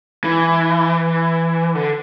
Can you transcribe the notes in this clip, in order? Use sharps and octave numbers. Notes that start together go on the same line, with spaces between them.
E3
D3